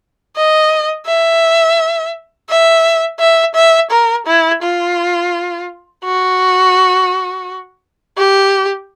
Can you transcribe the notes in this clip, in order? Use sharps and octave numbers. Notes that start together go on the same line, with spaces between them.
D#5
E5
E5
E5
E5
A#4
E4
F4
F#4
G4